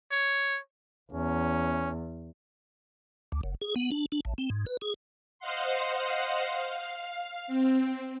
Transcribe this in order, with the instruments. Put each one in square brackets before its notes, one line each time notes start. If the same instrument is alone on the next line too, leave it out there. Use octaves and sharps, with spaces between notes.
[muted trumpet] C#5
[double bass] E2 [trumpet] C#4
[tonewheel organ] D2
F#1
G#4
B3
D4
D4
A1
C4
G#2
B4
G#4
[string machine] C5 D#5 F5 F#5 C6
F5
C4